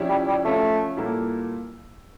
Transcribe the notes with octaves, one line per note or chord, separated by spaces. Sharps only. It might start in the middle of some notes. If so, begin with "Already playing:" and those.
Already playing: F3 C#4 E4 G4 D5
G3
G3
F3 A3 C#4 F4
A#2 G3 A#3 E4 A4